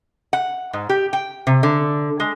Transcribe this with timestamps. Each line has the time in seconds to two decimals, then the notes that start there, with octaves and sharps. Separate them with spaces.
0.33 F#5
0.73 G#2
0.89 G4
1.13 G5
1.47 C3
1.63 D3
2.20 G#3